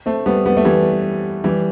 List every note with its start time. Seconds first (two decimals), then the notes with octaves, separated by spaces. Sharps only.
0.06 A3 C4
0.26 G3 B3
0.46 G3 B3
0.57 A3
0.65 E3 G3
1.44 E3 G3